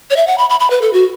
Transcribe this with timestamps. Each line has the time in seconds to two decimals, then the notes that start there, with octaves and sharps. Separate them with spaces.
0.10 C#5
0.16 E5
0.27 F#5
0.38 B5
0.50 B5
0.60 B5
0.70 B4
0.82 A4
0.93 F#4